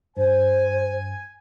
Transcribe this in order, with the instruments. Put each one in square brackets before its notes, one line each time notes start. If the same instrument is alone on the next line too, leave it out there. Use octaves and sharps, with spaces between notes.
[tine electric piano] G2 [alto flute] C5 [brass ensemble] G#5